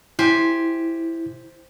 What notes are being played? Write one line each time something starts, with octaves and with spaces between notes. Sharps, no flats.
E4 G4 C5 G#5